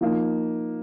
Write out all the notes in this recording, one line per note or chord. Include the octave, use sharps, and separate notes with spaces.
F3 A#3 D#4